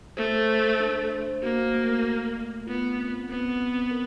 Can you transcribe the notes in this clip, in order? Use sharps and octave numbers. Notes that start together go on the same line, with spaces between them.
A3 C5
C5
D4
C5
A#3 F#4
A3
A#4
A3
B3 F4
C4
B3 C4
C4
A#4